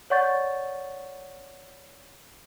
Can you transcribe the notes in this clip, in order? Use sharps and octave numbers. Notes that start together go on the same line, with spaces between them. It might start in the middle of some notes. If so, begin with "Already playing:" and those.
C#5 D5 F#5 C#6 G6 A6